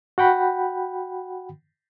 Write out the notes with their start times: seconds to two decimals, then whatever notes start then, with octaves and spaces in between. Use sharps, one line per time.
0.18 F#4 F#5 G5 B5